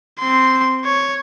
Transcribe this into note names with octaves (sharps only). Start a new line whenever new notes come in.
C4 C6
C#5